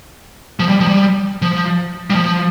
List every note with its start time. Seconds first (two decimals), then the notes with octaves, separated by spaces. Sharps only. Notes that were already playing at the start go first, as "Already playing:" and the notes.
0.60 F3
0.69 G3
0.80 F3
0.87 G3
1.42 F3
2.10 G3
2.15 F3